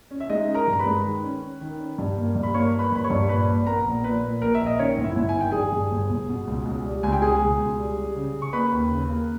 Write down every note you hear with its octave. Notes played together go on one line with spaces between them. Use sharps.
C#4
E5
G#3 D#4 D#5
C#4
A#4 A#5
G2
A#5
B4 B5
G#3
D#3
C#4
C#4
D#3
C#4
G2
A#3
G2
B5
A#3 C#5 C#6
A#3
B4 B5
G2 B5
C#5 C#6
G2
A#2 B4 B5
A#1
B3 A#4 A#5
A#1
A#2 B4
A#2
A#1 A#4
E5
A#1
D#5
D#3 C#4 C#5
G1
E4 E5
G1
G#5
D#3
G5
G2 G#4 G#5
G2
G1
G1
B2
C#2
C#2
G3
C#2 G#5
G5
B2 G#4 G#5
C#2
C#2
G3
G3
C#3
C#3
C#6
A#3 B4 B5
D#2
C#3
A#3